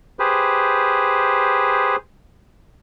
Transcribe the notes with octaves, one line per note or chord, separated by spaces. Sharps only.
G4 G#4 B4 C5